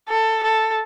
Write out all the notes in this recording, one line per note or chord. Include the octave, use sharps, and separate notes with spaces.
A4
A4